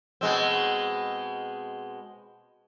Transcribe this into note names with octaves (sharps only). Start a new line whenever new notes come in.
B2 G#3 C4